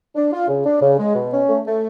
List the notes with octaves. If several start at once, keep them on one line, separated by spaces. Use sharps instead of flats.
D4
F4
C#3
D4
C#3
G#3
B2
C#4
A3
A3